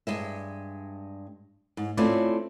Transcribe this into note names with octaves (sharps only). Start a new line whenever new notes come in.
G2 G#3 E5
G#2
A3 C4 C#4 E4 F4 D5